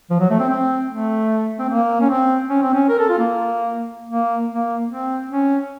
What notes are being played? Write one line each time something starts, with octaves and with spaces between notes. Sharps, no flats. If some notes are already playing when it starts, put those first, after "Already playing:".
F3
F#3
A3
C4
C4
A3
C4
A#3
C#4
C4
C#4
C4
C#4
A#4
A4
F4
A#3
A#3
A#3
C4
C#4